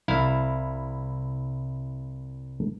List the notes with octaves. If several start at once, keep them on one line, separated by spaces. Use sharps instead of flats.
C2 E4 F5